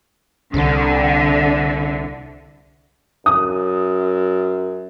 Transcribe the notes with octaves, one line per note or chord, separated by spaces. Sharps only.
C2 D3
F#2 D#6